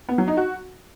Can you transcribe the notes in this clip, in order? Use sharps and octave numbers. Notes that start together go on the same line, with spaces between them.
B3
F#3
D#4
F#4